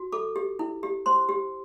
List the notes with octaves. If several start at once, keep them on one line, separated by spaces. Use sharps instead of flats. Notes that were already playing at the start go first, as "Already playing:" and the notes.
Already playing: F#4
A4 D6
G4
E4
G4
C5 C6
G4